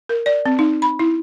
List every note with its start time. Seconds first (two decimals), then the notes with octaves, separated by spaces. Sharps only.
0.09 A#4
0.26 D5
0.46 C4
0.59 D#4
0.82 B5
0.99 E4